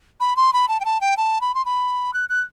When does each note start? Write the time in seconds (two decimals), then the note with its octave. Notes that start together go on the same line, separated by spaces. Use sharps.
0.20 B5
0.36 C6
0.53 B5
0.68 A5
0.80 G5
0.85 A5
1.01 G5
1.17 A5
1.41 B5
1.54 C6
1.65 B5
2.13 F#6
2.29 F#6